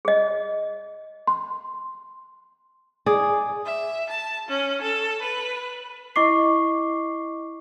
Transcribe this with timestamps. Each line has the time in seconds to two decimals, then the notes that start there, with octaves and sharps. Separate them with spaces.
0.05 G#4 D#5
1.27 C6
3.06 G#4 D5
3.65 E5
4.09 A5
4.48 C#4
4.82 A4
5.22 B4
6.16 E4 D#5 C#6 D6 C7